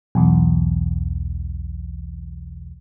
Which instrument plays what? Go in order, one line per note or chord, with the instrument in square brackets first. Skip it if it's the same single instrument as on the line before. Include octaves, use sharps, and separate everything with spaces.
[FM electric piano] B1 E2